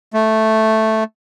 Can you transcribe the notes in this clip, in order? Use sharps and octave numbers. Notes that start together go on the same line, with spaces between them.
A3